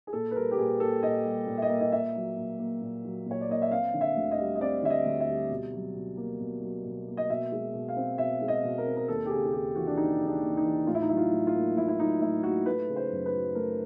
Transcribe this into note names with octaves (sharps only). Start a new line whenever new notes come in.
G#4
A#2 A4
B4
G3 A#4
G4
A#2 G#4
A#3 A4
A#2 D#5
G3
A#2
E5
D#5
A#3
D#5
A#2 E5
F#3
A#2
A#3
A#2
F#3
A#2 C#5
D5
A#3 D#5
E5
C4 F5
D3
E5
D2
D#5
G3
D#5
C4 D5
D3 E5
D#5
D2
E5
G3
B2
F#3
B2
A#3
B2
F#3
B2
A#3
D#5
B2 E5
G#3
B2
F5
C4
B2 E5
G#3
D#5
B2
A#4
C4
A#4
D#2 A4
G4
C#3 G#4
G#4
D#2 G4
E3 F#4
D4
D#2 D#4
C#3
D4
D#2
D#4
E3
A2 F4
E4
D#4
F#3 E4
F4
A2
F4
A#3
A2 E4
E4
F#3 D#4
A2 E4
A#3 F#4
A3 B4
C#3
C5
F#2
B4
F#3
A3 A#4